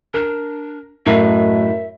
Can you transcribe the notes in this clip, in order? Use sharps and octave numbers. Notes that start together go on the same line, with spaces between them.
D4 A#4
F#2 A2 A3 F#4 A#4 D#5 E5